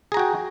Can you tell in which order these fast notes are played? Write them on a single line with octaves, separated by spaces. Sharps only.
G#4 A#5 F#4 G5